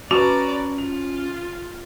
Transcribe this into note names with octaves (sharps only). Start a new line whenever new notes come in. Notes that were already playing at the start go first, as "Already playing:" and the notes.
C#4 F#4 B4 D5 A5 A#5 C#6 D6
F4 F7